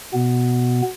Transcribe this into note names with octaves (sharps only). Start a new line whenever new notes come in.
B2 B3